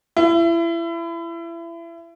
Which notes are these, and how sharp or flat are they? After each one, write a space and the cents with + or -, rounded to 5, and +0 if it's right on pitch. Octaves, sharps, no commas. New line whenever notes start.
E4 +30